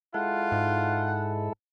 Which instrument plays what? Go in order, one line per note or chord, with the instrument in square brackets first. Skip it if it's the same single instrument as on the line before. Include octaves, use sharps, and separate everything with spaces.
[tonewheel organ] G#3 E4 A4 [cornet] F4 [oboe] F#5
[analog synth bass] G#2